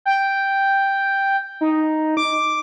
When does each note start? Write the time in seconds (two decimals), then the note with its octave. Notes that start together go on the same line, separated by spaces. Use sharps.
0.05 G5
1.61 D#4
2.17 D6